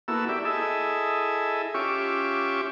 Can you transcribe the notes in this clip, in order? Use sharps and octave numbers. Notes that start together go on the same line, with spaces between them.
A#3 B3 E4 F#4 A4 E6
E4 G4 D5 E5
E4 G#4 A4 D#5 E5
C#4 F4 G4 E5 C#6 D6